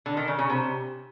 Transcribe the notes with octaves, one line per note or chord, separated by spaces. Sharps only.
D3
D#3
C#3
C#3
C3